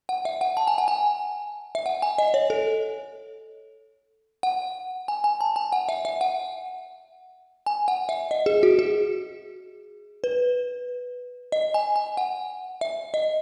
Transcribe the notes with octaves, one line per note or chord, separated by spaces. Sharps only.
F#5
E5
F#5
A5
G#5
F#5
G#5
E5
F#5
G#5
D#5
C#5
A4
F#5
G#5
G#5
A5
G#5
F#5
E5
E5
F#5
G#5
F#5
E5
D#5
G#4
F#4
G#4
B4
D#5
G#5
G#5
F#5
E5
D#5